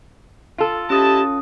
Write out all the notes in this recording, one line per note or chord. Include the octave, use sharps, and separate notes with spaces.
F4 A4
C#4 E4 G4 D#5 A5 D#6